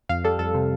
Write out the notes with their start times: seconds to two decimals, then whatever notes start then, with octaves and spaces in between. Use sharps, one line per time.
0.09 F2 F5
0.24 G3 A4
0.39 F2 A4
0.55 C3